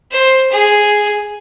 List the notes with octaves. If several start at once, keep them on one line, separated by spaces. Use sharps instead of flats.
C5
G#4